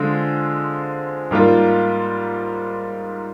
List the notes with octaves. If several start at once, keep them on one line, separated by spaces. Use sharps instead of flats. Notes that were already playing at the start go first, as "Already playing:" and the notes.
Already playing: D3 G#3 C4 F4
G#2 G3 A#3 F4